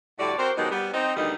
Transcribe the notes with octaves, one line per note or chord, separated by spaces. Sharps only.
A2 D3 G3 F#4 D5
C4 F#4 A#4 C5
B2 D#3 F#3 G#3 D#4 G4
G3 B3
C4 D#4
D2 B2 D#3 G3 D#4